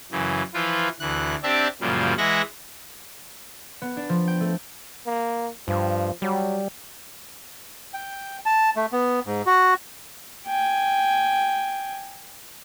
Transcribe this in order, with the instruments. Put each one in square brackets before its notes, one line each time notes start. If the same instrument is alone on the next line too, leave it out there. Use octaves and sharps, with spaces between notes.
[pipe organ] F#2 C#3 E3
E3 F3 E4 F4 B4
D2 E3 F#6
C4 D4 G4 D5 E5 A5
F#2 A#2 C#3 F3 G3
E3 G#3 E5 F#5 A#6
[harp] B3
D4
F3
G5
A3
[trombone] A#3
[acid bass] G2 [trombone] F3
[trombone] F#3 [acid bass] G3
[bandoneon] G5
A5
A3
B3
G#2
F#4
[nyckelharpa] G5 G#5